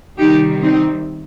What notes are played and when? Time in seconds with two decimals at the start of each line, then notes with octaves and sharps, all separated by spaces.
0.17 C3 D#3 G3 D#4 G4
0.62 C4 D#4